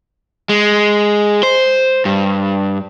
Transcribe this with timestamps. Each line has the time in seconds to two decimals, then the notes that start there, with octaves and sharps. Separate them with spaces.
0.49 G#3
1.43 C5
2.05 G2